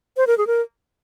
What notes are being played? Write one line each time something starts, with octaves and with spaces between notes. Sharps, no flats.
C5
A#4
G#4
A#4